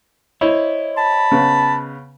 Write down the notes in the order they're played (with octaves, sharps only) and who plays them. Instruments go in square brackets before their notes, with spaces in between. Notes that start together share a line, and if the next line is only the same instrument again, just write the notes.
[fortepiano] E4 [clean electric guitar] C5 C#5 D#5
[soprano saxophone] A5 [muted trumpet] B5
[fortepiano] C#3 B3